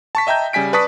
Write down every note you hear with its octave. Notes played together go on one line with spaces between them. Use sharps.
A5 C#6 B6
D#5 E5 G5 A#5 G6
C#3 G3 G#5 B6 D7
B4 D5 A5 C#6 D#6 B6